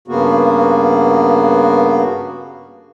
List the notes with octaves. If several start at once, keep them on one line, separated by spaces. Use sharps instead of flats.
G2 C#3 A#3 B3 F#4